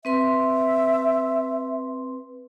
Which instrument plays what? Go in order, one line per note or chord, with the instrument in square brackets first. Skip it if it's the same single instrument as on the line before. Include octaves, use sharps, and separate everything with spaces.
[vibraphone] C4 B4 C6 [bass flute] E5